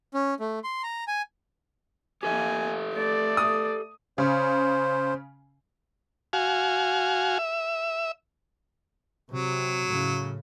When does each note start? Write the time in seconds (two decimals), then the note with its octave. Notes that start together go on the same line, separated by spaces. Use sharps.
0.14 C#4
0.40 A3
0.64 C6
0.83 A#5
1.08 G#5
2.23 A#3 G4 A4 E5 G#5
2.93 A3 D5
3.37 D#6
4.18 C#3 C5
6.33 F#4 F5 G#5
7.39 E5
9.31 C3 F#3
9.88 A2 C#3